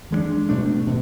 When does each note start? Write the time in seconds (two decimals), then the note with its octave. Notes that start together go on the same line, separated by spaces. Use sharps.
0.11 E3 G#3 B3 D4
0.49 B2 A3 D4
0.86 B2